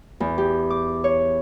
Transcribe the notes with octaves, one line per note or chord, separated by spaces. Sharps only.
E2
G4
D6
C#5